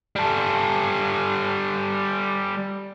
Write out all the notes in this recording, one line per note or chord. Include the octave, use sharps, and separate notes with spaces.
G3 A4